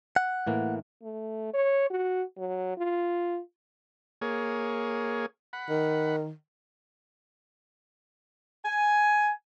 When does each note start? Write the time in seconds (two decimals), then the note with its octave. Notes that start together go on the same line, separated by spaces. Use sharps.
0.16 F#5
0.47 A2 E3 A#3
1.03 A3
1.53 C#5
1.90 F#4
2.38 F#3
2.78 F4
4.22 A#3 G#4 C#5
5.53 F#5 B5
5.69 D#3
8.65 G#5